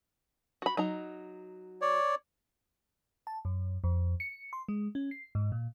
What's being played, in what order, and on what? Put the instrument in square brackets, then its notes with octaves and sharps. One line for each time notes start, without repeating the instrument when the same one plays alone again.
[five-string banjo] F#4 B5
F#3 D#4 A#5
[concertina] C#5 D5
[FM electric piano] A5
F#2
F2
C#7
C6
G#3
C#4
C7
G#2
A#2